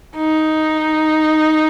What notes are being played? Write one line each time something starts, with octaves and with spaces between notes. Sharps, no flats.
D#4